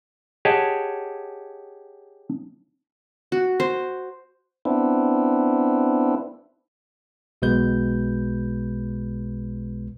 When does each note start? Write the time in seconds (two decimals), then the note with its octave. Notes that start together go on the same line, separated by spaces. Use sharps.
0.45 G4 G#4 C#5 D#5 F#5 A5
3.32 F#4
3.60 C5
4.65 B3 C4 D4 E4
7.42 B1 B2 G#3 B4 G6